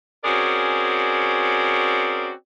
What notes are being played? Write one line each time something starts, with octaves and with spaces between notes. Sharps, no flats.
C4 C#4 F#4 G#4 A#4 D5